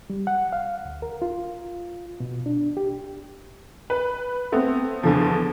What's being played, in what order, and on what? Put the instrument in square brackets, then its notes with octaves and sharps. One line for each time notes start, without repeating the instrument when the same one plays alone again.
[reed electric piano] G3
F#5
F5
D2
A#4
F4
B2
D4
G4
[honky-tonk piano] B4
A3 B3 C4
E2 D3 F3